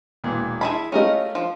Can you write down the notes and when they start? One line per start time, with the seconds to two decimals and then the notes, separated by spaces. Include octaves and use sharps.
0.24 E1 A#2 E3
0.61 E4 G#4 A5 B5 C6
0.92 A3 C#4 F4 G4 A#4 D#5
1.35 F3